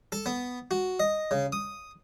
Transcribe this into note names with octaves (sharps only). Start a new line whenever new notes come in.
A4
B3
F#4
D#5
C#3
D#6